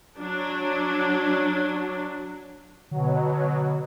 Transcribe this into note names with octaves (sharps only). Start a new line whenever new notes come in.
F#3 D4
B2 D3 F#3